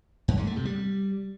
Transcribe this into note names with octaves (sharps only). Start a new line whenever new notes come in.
F#2
G#2
A3
C3
G3